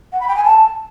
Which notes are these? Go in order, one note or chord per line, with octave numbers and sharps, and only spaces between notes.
F#5
B5
G5
G#5
A5